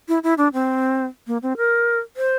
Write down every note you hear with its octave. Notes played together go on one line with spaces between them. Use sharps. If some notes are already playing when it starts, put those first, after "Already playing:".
E4
E4
D4
C4
A#3
C4
A#4
C5